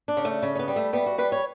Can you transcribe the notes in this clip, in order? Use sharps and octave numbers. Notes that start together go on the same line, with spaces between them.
D4
C#3
A3
C#3
C#4
B3
G3
A3
G3 B3
F#4
G3 B4
C#5